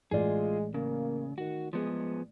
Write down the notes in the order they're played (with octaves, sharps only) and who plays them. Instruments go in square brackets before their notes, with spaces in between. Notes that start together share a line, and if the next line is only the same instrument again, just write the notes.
[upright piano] A1 D5 [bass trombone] G#3 [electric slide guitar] F4 G#4
[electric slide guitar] C#3 [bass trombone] A#3
[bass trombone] D#3 [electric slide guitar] F#4
[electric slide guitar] F3 B3 G#4 [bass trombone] G#3